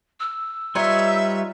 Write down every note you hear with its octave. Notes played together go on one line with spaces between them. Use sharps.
E6
G3 D#4 F4 B4 C#5 E5